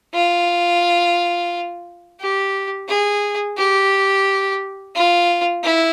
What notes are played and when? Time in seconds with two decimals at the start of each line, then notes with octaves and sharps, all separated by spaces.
0.14 F4
2.20 G4
2.88 G#4
3.57 G4
4.95 F4
5.63 E4